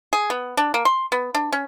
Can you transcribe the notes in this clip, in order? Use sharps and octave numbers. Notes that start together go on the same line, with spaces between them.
G#4
B3
D4
A#3
C6
B3
D4
C#4